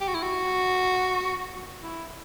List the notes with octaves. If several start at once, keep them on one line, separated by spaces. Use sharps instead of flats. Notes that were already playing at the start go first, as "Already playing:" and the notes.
G4
F#4
E4
F#4
E4